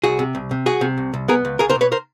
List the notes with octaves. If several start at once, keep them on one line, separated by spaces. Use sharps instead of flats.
C2 F#4 G#4
C3
C2
C3
C2 F#4 G#4
C3
C2
C2
B3 G#4 A#4
C#2
C#2 G#4 A#4
A#4 C5
B2
B4 C#5
A#4 C5